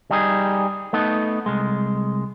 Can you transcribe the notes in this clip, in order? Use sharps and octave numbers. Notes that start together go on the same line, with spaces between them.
G3 D#4 G#4
A3 B3 D#4
C2 G#3